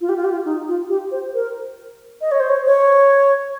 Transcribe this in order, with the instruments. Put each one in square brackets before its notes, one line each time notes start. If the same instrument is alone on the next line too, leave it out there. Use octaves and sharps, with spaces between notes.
[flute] F4
G4
F4
G4
F4
D#4
F4
G4
C5
A#4
D#5
C#5
C5
C#5
C#5